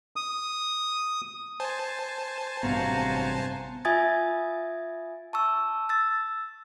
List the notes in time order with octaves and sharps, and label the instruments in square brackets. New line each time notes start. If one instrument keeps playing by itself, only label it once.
[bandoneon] D#6
[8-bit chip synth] C5 G#5 A5
[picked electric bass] A1 G2 C3 [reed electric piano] B3 [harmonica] F#4 F5 A#5
[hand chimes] F4 E5 G#5 D#6 G#6 A6
A5 C#6 E6
E6 A6